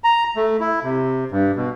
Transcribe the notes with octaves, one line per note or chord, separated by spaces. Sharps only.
A#5
A3
E4
C3
G2
B2